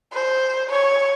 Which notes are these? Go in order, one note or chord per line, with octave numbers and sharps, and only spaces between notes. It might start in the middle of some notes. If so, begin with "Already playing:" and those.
C5
C#5